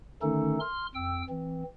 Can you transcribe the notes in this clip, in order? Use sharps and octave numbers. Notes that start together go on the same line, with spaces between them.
D3 D#3 A3 C#4 D#4 A4
C6 F6
F2 G5 E6
E3 C4